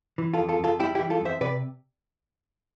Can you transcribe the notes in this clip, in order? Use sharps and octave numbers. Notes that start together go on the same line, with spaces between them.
E3
F4 A4
F2
F4 A4
F2 F4 A4
G3 E4 G4
E4 G4
E3
F4 A4
F2 C5 E5
C3 B4 D5